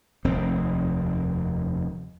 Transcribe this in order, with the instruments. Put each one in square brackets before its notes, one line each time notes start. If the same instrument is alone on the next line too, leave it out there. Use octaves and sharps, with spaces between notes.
[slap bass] F1 D#2 D#3 C4